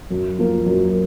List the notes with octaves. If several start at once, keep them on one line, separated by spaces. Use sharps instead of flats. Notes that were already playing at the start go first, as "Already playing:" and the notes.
F#2
F3 A#3
F#2